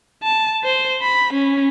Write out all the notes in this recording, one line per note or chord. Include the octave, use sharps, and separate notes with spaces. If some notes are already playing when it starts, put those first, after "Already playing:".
A5
C5
B5
C#4